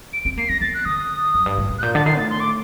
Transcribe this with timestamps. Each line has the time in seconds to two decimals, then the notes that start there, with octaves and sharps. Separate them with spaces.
0.13 D7
0.25 C4
0.37 A#3 C7
0.49 C4 A#6
0.61 C4 A6
0.74 F#6
0.85 D3 D#6
1.35 F#2
1.46 G2
1.58 A2
1.70 A2
1.78 F#6
1.82 A#2 G6
1.94 D3 A6
2.06 D#3 C7
2.18 A2 A6
2.30 C6
2.40 D6